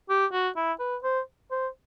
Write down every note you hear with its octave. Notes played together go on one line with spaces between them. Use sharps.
G4
F#4
E4
B4
C5
C5